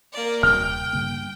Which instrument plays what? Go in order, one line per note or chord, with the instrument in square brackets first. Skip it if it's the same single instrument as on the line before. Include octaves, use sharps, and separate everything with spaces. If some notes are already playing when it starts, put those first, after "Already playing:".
[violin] A#3 D5
[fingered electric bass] D#1 C3 G3 [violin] G5 [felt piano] F6
[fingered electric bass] G2 C#3 A#3